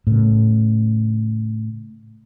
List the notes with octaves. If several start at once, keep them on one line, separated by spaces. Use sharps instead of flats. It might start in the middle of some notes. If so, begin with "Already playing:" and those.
A2 C#3